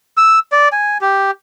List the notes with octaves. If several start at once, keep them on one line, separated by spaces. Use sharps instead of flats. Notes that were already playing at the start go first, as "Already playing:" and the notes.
E6
D5
G#5
G4